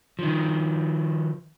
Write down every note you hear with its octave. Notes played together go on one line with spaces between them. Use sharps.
D#3 F3